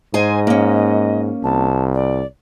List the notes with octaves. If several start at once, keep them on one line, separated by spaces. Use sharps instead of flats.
G#2 G#4 C5 D#5 G#5
A#3 C#4
C2 A5
D5